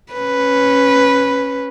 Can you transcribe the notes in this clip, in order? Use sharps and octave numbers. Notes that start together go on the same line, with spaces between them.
C#4 B4